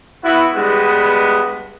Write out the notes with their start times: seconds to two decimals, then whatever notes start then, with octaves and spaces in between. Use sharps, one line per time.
0.24 B3 E4 F#4
0.55 G2 G#3 B3